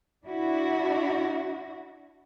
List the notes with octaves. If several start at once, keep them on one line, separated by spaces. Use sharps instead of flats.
D4 E4 F#4